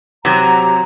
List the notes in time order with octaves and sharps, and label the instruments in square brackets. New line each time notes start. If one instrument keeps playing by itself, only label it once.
[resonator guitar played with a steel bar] C3 F#3 [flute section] A#5